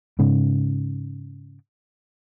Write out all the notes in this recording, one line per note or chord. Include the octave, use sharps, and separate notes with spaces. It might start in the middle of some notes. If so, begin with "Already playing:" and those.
G#2 C#3